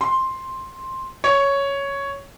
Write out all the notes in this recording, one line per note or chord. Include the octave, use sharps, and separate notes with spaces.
C6
C#5